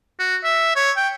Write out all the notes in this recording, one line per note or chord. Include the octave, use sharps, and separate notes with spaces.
F#4
E5
C#5
G5